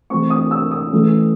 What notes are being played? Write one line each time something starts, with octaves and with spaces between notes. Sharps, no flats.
E3 A3 C4 C#6
D#6
E6
D#6
E3 A3 C#4